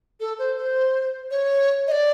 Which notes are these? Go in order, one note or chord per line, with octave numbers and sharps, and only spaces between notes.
A4
C5
C5
C#5
D#5
D5